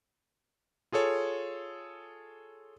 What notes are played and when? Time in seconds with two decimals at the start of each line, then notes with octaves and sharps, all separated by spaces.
0.92 F4 G#4 A4 C#5